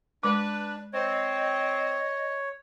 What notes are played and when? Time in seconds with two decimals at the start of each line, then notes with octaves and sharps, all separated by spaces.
0.23 G#3 D4 B4 D6
0.93 C4 C#5 D#5